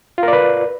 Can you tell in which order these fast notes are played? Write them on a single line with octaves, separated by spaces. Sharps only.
F4 A#4 D5 B4